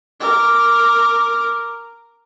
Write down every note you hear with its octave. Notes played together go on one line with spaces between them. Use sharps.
A#4 D6